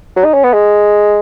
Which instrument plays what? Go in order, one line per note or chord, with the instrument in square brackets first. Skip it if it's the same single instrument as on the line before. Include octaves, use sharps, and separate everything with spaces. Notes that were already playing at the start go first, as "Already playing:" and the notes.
[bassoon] F#3
D#4
C#4
B3
G#3